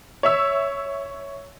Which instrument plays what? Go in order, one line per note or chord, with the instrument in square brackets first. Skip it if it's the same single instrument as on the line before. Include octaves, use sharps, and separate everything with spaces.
[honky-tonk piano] C#5 E5 E6